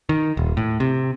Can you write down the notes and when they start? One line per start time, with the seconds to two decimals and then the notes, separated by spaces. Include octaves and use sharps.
0.09 D#3
0.37 D#1
0.57 A2
0.80 C3